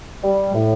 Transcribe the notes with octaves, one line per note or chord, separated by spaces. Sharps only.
G3
A2